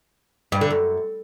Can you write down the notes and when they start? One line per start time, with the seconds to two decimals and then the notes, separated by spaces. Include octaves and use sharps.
0.52 G2
0.61 D3
0.70 F#2